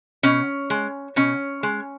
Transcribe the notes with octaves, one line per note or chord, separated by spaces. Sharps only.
B2 C#4
G#3
B2 C#4
G#3